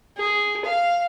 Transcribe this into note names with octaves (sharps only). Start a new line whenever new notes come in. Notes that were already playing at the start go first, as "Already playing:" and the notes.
G#4
F5